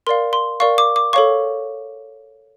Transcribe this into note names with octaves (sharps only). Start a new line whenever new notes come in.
A#4 D5 F5 C6
C6
A#4 D5 F5 C#6
D6
D6
A4 C#5 F5 C#6